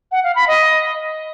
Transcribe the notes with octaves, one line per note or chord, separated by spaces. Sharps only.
F#5
F5
B5
D#5